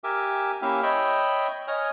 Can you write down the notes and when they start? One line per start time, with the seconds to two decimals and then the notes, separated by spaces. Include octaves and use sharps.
0.04 G4 A#4 E5 G#5 D6 E6
0.62 A#3 C#4 E4 G4 E5 F5
0.83 C#5 D#5 E5 G5 B5
1.68 C#5 D#5 G#5 D#6 F6